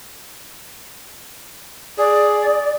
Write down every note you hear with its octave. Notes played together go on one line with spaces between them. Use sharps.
G#4 D5